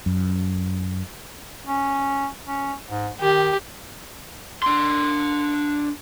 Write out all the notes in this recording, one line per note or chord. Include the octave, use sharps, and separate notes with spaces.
F#2
C#4
C#4
G#2
D#3 G4
D4 C6